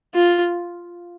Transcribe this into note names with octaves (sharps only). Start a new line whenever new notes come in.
F4